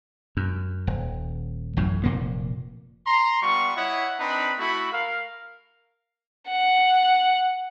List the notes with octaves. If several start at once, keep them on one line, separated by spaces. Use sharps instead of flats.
F#2
D#1
A1 F#2 A2
F1 A#2 A#3
A#5 C6
G3 B3 F4 C#6
E4 C#5 D#5 E5 F#5
C4 D4 D#4 B4 B5
A3 E4 F#4 B5
A#4 F5
F#5